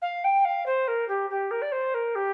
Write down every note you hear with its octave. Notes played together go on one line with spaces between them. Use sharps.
F5
G5
F5
C5
A#4
G4
G4
A#4
D5
C5
A#4
G4